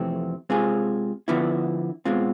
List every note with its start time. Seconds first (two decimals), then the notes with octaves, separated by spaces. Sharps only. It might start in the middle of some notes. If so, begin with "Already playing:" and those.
Already playing: F2 C3 E3 A3 C4
0.50 C3 G#3 C4 F4 G#4
1.28 D3 F3 B3 E4
2.05 B2 G#3 C4 F4